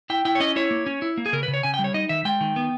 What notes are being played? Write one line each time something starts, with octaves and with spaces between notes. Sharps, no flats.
E4 G5
E4 G5
C#5
C#4 D#5
E4 C#5
A#3
C#4
E4
A#3
G#4
C#3 A#4
B4
C#3
C#5
C#3 G#5
G5
G3
C#5
D#4 D#5
D#3 E5
G#3 G5
D#3
B3